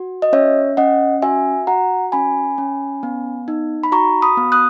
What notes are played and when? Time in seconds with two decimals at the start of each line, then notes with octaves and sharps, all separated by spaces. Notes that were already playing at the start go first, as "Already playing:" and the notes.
Already playing: F#4
0.22 D#5
0.33 C#4 C#5 E5
0.77 C#4 D#5 F#5
1.22 F#4 E5 G#5
1.67 F#4 F#5 A#5
2.12 C#4 G#5 B5
2.58 C#4
3.03 B3
3.48 D#4
3.84 B5
3.92 F#4 A#5 C#6
4.22 B5 D#6
4.37 B3
4.52 D#6 F#6